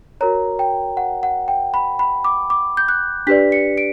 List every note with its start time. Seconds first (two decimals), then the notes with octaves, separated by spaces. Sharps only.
0.21 F#4 A#4 C#5 A#5
0.59 G5
0.97 F#5
1.23 F#5
1.48 G5
1.74 B5
1.99 B5
2.24 D6
2.50 D6
2.77 G6
2.89 F#6
3.27 D4 G4 B4 D5 B6
3.52 C#7
3.78 D7